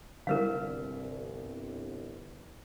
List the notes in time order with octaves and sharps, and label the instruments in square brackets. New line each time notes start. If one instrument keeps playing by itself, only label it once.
[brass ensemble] G1 C2 [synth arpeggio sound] D3 G3 E4 [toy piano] A#4 B4 F5